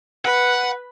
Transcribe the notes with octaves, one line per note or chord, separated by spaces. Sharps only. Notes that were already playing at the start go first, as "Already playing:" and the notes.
B4 F#5